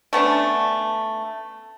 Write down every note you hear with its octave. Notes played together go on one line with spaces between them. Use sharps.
A3 B3 C#4 D4